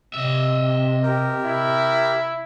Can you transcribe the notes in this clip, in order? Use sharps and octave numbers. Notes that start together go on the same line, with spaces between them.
C3 D#5 E5
G4 A#4
E4